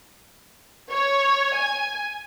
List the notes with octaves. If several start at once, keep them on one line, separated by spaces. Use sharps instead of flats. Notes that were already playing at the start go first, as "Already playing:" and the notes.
C#5
G#5